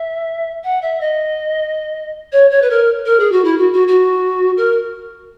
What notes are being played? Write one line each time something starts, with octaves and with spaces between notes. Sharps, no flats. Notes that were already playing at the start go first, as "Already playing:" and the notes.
Already playing: E5
F#5
E5
D#5
C#5
C#5
B4
A#4
A#4
G#4
F#4
E4
F#4
F#4
F#4
A#4